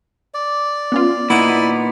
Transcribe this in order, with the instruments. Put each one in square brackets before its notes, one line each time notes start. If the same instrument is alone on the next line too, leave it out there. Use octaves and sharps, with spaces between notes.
[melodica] D5
[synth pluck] B3 C#4 F4
[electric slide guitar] A#2 B3 D#4 [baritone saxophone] E4 [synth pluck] F#5